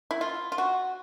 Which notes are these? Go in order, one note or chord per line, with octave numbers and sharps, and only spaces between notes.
E4
F4
F4
F#4